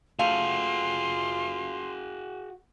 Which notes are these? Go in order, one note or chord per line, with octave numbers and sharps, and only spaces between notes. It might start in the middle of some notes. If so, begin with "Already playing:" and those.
A3 F4 F#4 G#4 F5 C6